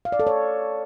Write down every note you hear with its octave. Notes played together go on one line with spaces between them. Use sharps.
F5
D5
A4
C#5